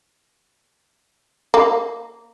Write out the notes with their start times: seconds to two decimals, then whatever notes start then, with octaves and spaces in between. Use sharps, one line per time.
1.54 A#3